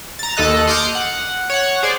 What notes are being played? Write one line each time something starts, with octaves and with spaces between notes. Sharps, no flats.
A#5 A6
D#2 A4 D#5 F#6
C6 D6 D#6 F6 G6 C#7
F#5
C#5 F#5
G#4 C5 D5